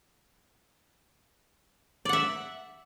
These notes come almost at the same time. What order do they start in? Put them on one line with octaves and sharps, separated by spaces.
D5 F#5 E5